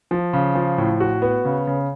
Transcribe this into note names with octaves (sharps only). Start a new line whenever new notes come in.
F3
C#3
F3
A2
F#4
B3
C#3
C#3